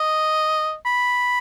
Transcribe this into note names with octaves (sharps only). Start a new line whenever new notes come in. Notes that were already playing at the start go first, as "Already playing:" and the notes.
Already playing: D#5
B5